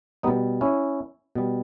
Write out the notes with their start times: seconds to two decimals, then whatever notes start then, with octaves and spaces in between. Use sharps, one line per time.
0.23 B2 G3 B3 D#4
0.61 C#4 E4
1.35 B2 G3